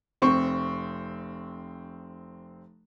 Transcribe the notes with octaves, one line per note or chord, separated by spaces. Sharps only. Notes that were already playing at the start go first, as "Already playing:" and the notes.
F1 C4 C#6